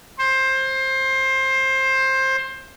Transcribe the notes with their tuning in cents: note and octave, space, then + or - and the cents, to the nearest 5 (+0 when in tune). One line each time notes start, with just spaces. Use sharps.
C5 +20